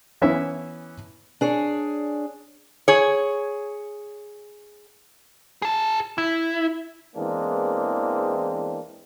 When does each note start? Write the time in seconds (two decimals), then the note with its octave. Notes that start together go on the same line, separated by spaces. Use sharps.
0.22 E3 B3 C#4 E4 E5
1.41 D4 G#4 C#5
2.88 G#4 C#5
5.62 G#4 A5
6.18 E4
7.16 E2 E3 G#3 A#3 C4 D4